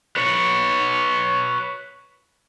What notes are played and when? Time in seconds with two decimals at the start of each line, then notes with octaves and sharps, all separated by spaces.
0.17 B4 C#5